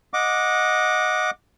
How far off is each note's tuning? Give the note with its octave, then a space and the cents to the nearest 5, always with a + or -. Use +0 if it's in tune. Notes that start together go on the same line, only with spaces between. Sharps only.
D#5 +0 F#5 -20 D6 +0